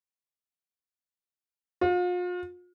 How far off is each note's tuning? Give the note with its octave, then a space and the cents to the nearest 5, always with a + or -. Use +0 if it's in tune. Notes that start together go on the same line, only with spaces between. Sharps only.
F4 +40